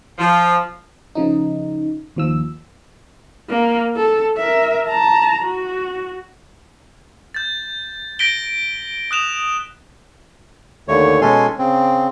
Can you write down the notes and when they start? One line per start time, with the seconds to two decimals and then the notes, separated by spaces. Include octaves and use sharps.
0.19 F3
1.15 C#3 F3 D#4
2.16 D#2 F3 E6
3.49 A#3
3.96 A4
4.37 A#4 E5
4.88 A5 A#5
5.43 F#4
7.34 G6 A6
8.19 G6 A#6 B6 D7 G7
9.11 D#6 F#6 E7 F7
10.88 D#2 D3 A3 C#5
11.21 B2 G#3 C#4 A4 G#5 C6
11.58 C#3 C4